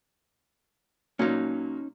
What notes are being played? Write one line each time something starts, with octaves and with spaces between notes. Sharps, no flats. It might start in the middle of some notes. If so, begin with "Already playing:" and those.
A#2 F#3 A#3 C#4 D#4